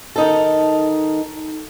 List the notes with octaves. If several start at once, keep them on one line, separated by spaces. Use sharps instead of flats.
D#3 D#4 A4